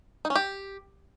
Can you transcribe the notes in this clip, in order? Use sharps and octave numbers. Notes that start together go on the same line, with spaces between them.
D#4
C#4
G4